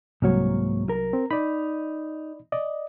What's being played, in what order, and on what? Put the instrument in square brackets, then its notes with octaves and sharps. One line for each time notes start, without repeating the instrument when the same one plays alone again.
[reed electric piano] C2 F#3 [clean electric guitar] G#2 A#3 C#5
[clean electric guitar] A#4
[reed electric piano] C4
[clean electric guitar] D#4 [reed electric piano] D5 B5
[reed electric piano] D5 D#5